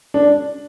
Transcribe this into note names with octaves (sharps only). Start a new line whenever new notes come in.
D4